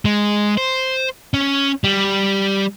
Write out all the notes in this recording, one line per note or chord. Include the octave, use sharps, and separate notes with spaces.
G#3
C5
C#4
G3